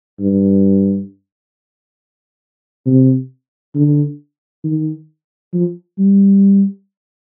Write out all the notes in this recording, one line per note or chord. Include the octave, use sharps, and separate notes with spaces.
G2
C3
D3
D#3
F3
G3